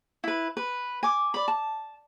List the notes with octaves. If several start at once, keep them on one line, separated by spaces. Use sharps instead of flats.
E4 B4
B4
G#5 D6
D5 B5
A5